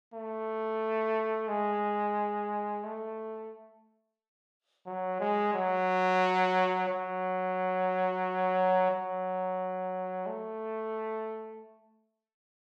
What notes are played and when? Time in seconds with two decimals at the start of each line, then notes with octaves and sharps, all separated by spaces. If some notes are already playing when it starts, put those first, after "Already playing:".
0.14 A3
1.48 G#3
2.84 A3
4.86 F#3
5.20 G#3
5.53 F#3
6.89 F#3
8.91 F#3
10.26 A3